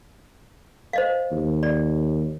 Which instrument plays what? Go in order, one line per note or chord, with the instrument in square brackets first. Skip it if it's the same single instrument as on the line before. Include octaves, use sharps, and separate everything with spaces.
[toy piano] C5 D#5 F5
[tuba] D#2
[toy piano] D5